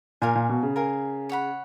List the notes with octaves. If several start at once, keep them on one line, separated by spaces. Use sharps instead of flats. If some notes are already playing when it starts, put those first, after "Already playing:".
A#2 A#4 F5 G#5
A#2
B2
C#3
A#4 F5 G#5
C#5 F#5 B5